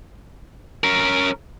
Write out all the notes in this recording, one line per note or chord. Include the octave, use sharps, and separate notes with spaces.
C#4 A#4